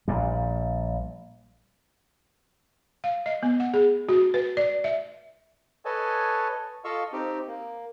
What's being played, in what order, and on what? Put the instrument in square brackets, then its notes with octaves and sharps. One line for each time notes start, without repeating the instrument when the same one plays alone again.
[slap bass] A#1 A#2 G3
[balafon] F5
D#5
B3
F#5
G#4
F#4
B4
D5
E5
[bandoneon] A4 B4 C#5 D#5 G#5 A5
F4 A4 D#5 F5 C#6 E6
C4 D#4 G4
A#3